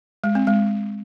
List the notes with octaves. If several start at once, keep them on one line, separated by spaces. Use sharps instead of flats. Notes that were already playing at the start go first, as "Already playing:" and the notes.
G#3
C4
G#3